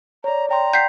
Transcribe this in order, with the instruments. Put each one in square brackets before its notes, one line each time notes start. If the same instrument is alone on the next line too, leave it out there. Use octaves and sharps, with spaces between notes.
[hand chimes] C#5 D5 [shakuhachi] A#5
[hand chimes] D5 G5 C6 [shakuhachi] A#5
[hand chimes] F#5 G5 [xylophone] G6 B6 C7